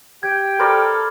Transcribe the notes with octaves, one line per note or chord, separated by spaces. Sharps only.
G4 G5 G#6
A4 A#4 C5 D5 B5 F6